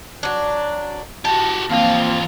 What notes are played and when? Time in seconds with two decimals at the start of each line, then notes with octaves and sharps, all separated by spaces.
0.23 F#3 D4
1.25 F#4 G4 A5
1.69 E2 F3 A#3 C4 F4